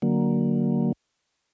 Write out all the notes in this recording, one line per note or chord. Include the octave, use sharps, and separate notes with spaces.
D3 F#3 A#3